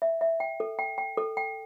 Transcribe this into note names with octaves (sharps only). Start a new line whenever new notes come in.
E5
E5
G5
A4
G5
G5
A4
G5